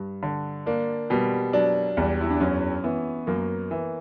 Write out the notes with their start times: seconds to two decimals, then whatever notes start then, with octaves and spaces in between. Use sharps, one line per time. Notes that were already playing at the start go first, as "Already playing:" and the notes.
Already playing: G2
0.23 D3
0.66 A#3 D4
1.10 B2 G3
1.53 F#3 D4
1.97 E2 G3
2.21 E4
2.30 D4
2.40 F#2 C#4
2.84 E3 B3
3.27 F#2 A#3
3.71 E3